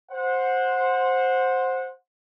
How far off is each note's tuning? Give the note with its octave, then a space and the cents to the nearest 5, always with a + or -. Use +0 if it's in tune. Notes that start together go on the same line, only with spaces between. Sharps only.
C5 +5 F#5 -20